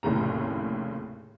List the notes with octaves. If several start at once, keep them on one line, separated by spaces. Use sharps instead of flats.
F1 D#2 A2 C#3 A#5